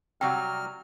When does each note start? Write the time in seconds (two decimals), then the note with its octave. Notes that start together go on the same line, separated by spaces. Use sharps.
0.21 C3 F#3 G3 F#5 G5 F6